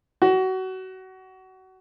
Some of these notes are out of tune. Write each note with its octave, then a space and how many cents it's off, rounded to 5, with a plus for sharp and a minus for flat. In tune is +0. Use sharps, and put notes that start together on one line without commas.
F#4 +25